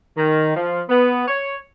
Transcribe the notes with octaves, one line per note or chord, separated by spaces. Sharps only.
D#3
F3
B3
C#5